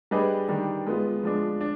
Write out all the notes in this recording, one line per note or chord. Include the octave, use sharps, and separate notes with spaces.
G3 D4 G#4 B4 D#5
D#3 G3 D4
G#3 B3 F4
F3 G#3 D4
D4